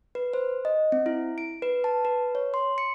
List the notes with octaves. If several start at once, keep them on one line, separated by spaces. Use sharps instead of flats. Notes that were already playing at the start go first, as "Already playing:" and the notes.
B4
C5
D#5
C4
E4
D7
B4
A5
B4
C#5
C6
C#7